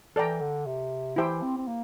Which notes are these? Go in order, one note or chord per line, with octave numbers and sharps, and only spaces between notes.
E3 A4 D5 G5 A#5
D3
C3
E3 E4 G4 C5 E5 G5
C4
C4
A#3